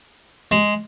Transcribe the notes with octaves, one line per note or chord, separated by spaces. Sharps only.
G#3